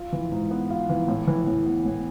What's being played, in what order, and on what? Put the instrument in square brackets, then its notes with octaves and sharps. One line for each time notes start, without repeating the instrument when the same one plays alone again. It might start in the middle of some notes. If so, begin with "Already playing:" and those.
Already playing: [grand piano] F4
E3
G#2
B3
F4
E3
A2
E3
A2
B3
A2